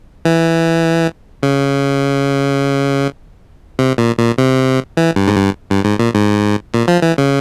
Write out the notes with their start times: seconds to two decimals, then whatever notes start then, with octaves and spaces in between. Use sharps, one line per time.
0.25 E3
1.43 C#3
3.79 C3
3.98 A#2
4.18 A#2
4.38 C3
4.97 E3
5.16 G2
5.28 G#2
5.36 G2
5.70 G2
5.84 G#2
5.99 A#2
6.15 G#2
6.74 A#2
6.88 F3
7.02 E3
7.18 C#3